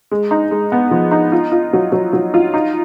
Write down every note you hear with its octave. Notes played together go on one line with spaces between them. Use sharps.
G#3
D#4
G#3
B3
F3
D#4
F4
F4
F#3
F#3
F#3
F4
D#4